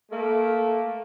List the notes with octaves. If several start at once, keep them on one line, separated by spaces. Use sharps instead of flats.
A3 A#3